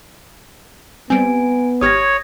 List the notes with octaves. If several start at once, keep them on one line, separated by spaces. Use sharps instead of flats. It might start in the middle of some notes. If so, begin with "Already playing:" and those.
G3 B3 C4 G#5 D7
G#1 G4 C#5 D#6 F6 G#6 A#6